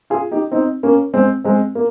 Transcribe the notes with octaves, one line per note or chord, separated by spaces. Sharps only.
F4 G#4
D#4 G4
C4 D#4
A#3 C#4
G#3 C4
G#3 C4
A#3